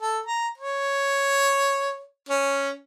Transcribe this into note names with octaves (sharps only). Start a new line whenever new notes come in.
A4
A#5
C#5
C#4